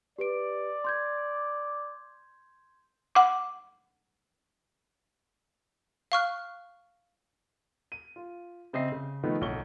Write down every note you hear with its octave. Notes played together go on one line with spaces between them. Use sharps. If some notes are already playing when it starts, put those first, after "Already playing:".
G4 B4 D5 D7
C6 G6 G#6
F#5 D6
F5 C#6 F6 F#6
D#7
F4
C#3 C4 D#5 E5 C7
C#3
D#3 F3 A3 B3 D#4
D1 B1 F#2 C#6 G7